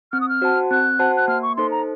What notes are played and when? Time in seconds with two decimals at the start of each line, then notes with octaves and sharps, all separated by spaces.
0.12 C4 F6
0.21 D#6
0.29 F6
0.42 F#4 C5 F#5 A5
0.71 C4 F#6
0.99 F#4 C5 F#5 A5
1.17 F#6
1.28 A#3 F6
1.42 C#6
1.57 D#4 A4 C5 C6
1.71 A#5